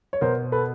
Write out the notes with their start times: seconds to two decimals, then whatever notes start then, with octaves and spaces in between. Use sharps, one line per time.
0.13 C#5
0.21 B2 A#4 C5
0.52 A4 B4